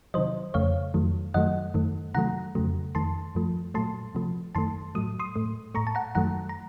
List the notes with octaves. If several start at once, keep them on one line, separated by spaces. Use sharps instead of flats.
C3 D#3 F#3 C5 D#5
F2 C#3 A3 C#5 F5
F2 D#3 F#3 A3
F#2 D#3 F#3 A3 D#5 F#5
F#2 D#3 A3
C3 D#3 F#3 A3 F#5 A#5
F2 C#3 F#3 A3
F2 D#3 A3 A5 C6
F#2 F3 A3
A#2 F#3 A3 A5 C6
C3 F3 A3
F#2 D#3 A3 A5 C6
A2 F#3 A3 D#6
C6 D#6
A2 A3
A2 A3 A#5 C#6
A5
F#5 A#5
F#2 D#3 F#3 A3 F#5 A#5
A#5